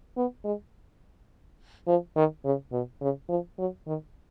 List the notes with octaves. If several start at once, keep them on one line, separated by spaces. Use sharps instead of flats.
B3
G#3
F3
D#3
C#3
B2
C#3
F3
F#3
D#3